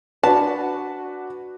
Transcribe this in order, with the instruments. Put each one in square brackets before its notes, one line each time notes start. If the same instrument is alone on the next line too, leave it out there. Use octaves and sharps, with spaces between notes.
[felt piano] D4 F#4 B4 [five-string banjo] A5